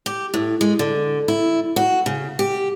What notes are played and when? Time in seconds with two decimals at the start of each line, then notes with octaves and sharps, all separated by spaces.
0.06 G4
0.34 A2
0.61 G#3
0.79 D3
1.28 E4
1.76 F#4
2.06 C#3
2.39 G4